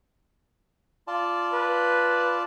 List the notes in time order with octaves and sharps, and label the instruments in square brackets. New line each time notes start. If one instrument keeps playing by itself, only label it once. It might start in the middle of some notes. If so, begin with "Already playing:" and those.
[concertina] F4 D5 A5
[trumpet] B4